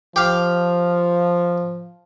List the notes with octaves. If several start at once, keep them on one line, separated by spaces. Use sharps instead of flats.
F3 G4 F5